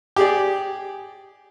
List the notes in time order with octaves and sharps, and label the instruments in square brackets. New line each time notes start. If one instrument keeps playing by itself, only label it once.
[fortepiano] G4 G#4 D5